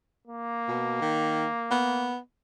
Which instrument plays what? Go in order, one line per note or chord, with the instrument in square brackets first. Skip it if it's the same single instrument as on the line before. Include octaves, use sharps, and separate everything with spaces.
[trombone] A#3
[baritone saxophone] B2
D#3
B3